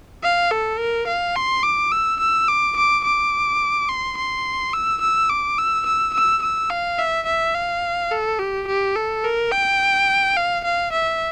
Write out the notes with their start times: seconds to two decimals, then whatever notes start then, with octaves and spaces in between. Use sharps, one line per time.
0.23 F5
0.51 A4
0.79 A#4
1.07 F5
1.35 C6
1.63 D6
1.92 E6
2.20 E6
2.48 D6
2.77 D6
3.05 D6
3.89 C6
4.17 C6
4.73 E6
5.01 E6
5.30 D6
5.58 E6
5.86 E6
6.14 E6
6.42 E6
6.70 F5
6.98 E5
7.26 E5
7.55 F5
8.11 A4
8.39 G4
8.68 G4
8.95 A4
9.24 A#4
9.52 G5
10.36 F5
10.64 F5
10.92 E5